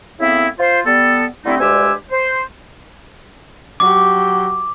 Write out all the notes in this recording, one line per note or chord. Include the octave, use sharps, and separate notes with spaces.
C#3 A3 B3 C4 E4
F4 C5
G3 B3 A4
D3 G3 A3 C4 D#4 E4
D2 G2 G#3 G4 G#5 E6
C5
F#3 G4 D6